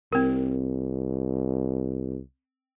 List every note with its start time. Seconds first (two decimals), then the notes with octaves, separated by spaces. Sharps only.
0.13 C2 C4 A#4